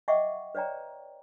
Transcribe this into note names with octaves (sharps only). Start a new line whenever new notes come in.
D#5 E5 F#5 G5 C#6 D6
B4 C#5 D5 G5 A#5